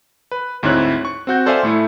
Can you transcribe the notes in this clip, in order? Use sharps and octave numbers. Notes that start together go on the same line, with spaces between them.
B4
D2 G#2 C4 E4 C#5 F#6
C#6
C4 F#4 G6
A4 C5 D5 E5 F5 G#5
A2 A3 E4